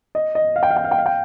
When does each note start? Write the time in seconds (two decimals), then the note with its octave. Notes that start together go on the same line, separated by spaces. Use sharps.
0.15 D#5
0.35 D#5
0.56 F5
0.63 G5
0.70 F5
0.76 G5
0.84 F5
0.91 G5
0.98 F5
1.06 G5